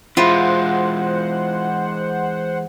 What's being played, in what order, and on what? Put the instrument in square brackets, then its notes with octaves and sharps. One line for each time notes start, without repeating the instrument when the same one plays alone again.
[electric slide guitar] E3 G#3 [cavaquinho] E4 F4 [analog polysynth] C5 F#5